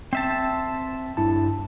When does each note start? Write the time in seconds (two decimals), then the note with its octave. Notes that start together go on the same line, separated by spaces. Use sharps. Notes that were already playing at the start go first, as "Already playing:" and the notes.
0.13 C4 E5 A5
1.17 G2 E4 A5